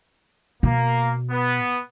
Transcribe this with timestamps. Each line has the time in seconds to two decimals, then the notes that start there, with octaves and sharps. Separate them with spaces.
0.63 B2 A#3
1.31 B3